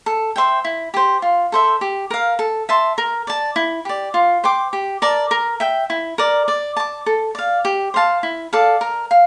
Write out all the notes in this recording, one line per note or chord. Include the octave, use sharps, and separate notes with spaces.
A4
C5 E5 G5
E4
G4 C5
F4
A4 C5 E5
G4
A#4 F5
A4
E5 A5 C6
A#4
D5 A5
E4
G4 D5
F4
C5 G5 D6
G4
A#4 D5 A5
A#4
E5 G5
E4
A#4 D5
D5
A5 D6
A4
D5 F5
G4
C5 F5 A5
E4
A4 D5 F5
A#4
F5